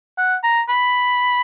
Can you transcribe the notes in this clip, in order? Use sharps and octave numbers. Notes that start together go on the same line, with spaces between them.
F#5
A#5
B5